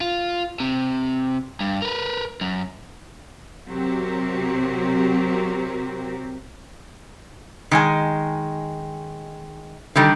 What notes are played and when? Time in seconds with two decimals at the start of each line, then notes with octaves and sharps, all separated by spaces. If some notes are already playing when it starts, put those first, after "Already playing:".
0.01 F4
0.60 C3
1.61 G2
1.82 A#4 B4
2.41 F#2
3.67 C3 F#3 C4 F#4 G4 A#4
7.71 D#3 G#3 G#5
9.96 D3 D#3 G3